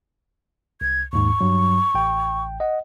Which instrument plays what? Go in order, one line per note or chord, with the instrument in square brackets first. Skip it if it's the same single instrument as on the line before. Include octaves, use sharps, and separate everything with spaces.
[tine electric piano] C2 [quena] G#6
[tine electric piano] D#2 G#2 [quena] C#6
[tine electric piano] G2 F#3
A1 G5
D#5 F#5